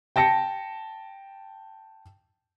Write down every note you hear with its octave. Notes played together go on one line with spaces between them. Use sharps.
G5 A5 A#6 C#7